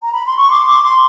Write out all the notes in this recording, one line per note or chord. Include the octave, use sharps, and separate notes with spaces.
A#5
B5
C6
C#6
C6 D6
C6 D6
C6 D6